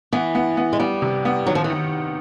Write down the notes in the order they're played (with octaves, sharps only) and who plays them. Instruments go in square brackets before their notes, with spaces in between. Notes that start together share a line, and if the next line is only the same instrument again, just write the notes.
[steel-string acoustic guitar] E3 [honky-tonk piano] B3
[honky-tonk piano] B3
B3
[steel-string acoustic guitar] G#3
[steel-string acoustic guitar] G3 [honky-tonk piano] B3
[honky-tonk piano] C3
B3
[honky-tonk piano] D#3 [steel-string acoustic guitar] F#3
[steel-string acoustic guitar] F3
E3
[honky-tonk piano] D#3